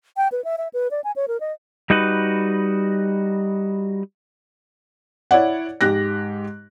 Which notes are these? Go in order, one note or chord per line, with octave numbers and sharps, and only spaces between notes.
G5
B4
E5
E5
B4
D5
G#5
C#5
A#4
D#5
G3 D#4 F#4 B4
E4 C#5 D5 F#5
G#2 G4 F#6 A#6